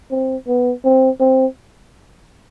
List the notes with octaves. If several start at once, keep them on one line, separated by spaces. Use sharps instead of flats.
C4
B3
C4
C4